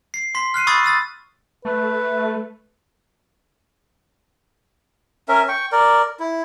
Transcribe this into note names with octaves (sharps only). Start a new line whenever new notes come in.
C7
C6 B6
F6 F#6 C7 D#7
B5 C#6 D#6 E6 G#6 A6
B5 D#6 E6 A6
A3 B4
C#4 A#4 E5
G5 C#6
A#4 D5
E4